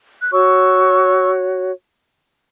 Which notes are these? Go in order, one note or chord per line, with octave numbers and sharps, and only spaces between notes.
F#6
F#4 C#5 C#6 E6